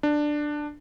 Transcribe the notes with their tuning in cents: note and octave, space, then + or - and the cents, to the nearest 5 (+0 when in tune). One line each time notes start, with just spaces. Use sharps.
D4 +10